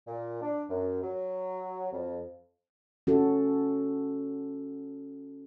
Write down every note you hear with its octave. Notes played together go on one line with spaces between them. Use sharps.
A#2
D4
F#2
F#3
F2
C#4 F#4 A4